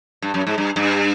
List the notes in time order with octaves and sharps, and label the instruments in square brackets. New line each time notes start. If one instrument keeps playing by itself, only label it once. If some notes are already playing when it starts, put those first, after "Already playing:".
[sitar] G2
F#2
G#2
G2
G2